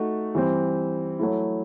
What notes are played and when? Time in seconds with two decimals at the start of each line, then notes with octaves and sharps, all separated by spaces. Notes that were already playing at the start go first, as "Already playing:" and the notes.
Already playing: A3 D#4 F#4
0.35 E3 G3 C4
1.19 F#3 A3 E4